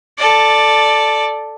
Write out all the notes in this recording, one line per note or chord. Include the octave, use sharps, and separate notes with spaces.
A4 D5